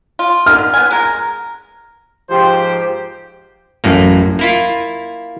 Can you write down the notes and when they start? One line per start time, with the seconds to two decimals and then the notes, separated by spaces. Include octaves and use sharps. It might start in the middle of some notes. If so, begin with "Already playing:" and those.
0.19 F4
0.46 D3 D#3 F6
0.74 B3 G#5
0.91 G#3 A#4
2.30 G#2 F3 G4 C5
3.84 A1 F#2 A2 A#3
4.39 A#3 E4 F4